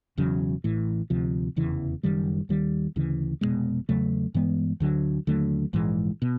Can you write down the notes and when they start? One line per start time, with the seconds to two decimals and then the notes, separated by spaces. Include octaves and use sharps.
0.18 E1 E2 C#3 F#3
0.64 A1 A2 E3
1.10 D2 C3 F3
1.56 F1 E2 C#3 E3
2.03 F#1 F#2 D#3 G3
2.49 D#2 D#3 G3
2.96 D2 C#3 E3
3.41 F1 E2 B2 G#3
3.89 E2 C#3 F#3 A3
4.34 G2 E3 G#3 B3
4.80 D2 D3 F#3
5.27 D#2 D3 F#3 A3
5.73 A#1 G#2 E3 G#3
6.22 B2